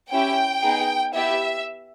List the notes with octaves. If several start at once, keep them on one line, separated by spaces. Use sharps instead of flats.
C#4 E4 G4 G5
B3 D#4 G#4
B3 E4 G4 E5